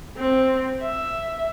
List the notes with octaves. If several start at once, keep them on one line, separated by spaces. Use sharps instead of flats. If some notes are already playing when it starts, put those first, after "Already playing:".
C4
E5